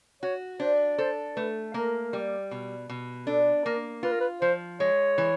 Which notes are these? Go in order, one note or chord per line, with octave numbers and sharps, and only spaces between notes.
F#4 C#5
D4 C5
A4 C5
A3 B4
A#3 A#4
G3
B2
B2
D4 A4
A#3 A#4
F4 B4
A#4
B4
F3 C5
G#3 C#5
E3